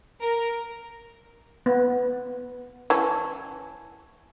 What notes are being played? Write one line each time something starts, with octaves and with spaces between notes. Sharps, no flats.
A#4
B3
E3 C#4 A5 G#6